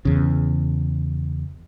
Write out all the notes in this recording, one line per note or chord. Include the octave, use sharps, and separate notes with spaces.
E2 C#3